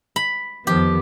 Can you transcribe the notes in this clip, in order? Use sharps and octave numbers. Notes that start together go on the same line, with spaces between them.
B5
F2 D#3 F3 B3 G4